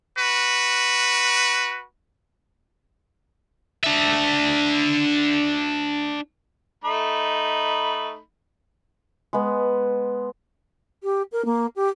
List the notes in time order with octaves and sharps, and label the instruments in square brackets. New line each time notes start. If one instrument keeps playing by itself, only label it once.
[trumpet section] F#4 B4
[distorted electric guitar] D4 E5
[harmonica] A3 D#4 B5
[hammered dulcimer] G#3 B3
[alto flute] G4
A#4
A#3
G4